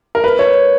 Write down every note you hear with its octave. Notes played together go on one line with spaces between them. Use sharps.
A#4
B4
C#5